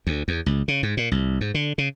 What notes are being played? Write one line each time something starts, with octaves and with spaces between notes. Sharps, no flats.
D2
E2
C#2
C#3
G#2
A#2
C2
G#2
D3
C#3